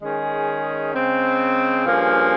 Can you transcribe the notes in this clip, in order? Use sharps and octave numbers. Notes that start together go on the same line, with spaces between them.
D#3 G#3 C#4 G#4
C#3 G#3 C4
G2 F3 A#3 C#4 G#4